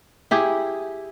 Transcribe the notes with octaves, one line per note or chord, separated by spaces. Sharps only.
E4 G4 G#4